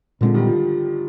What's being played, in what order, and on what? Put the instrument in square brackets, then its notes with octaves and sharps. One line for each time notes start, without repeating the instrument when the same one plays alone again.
[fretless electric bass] A#2 G#3 C4 [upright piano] D3 F3
[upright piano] D#3 G3
F3